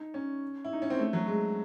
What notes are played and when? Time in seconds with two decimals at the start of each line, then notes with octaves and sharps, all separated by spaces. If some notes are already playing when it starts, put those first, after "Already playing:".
Already playing: D#4
0.14 C#4
0.65 E4
0.73 D#4
0.82 C#4
0.90 C4
0.99 A3
1.13 F#3
1.27 G#3